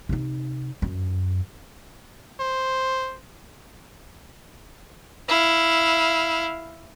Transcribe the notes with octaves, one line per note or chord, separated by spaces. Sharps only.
C3 D#4
F#2
C5
E4 F5